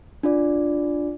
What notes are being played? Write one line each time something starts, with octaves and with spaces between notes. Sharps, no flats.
D4 F4 D5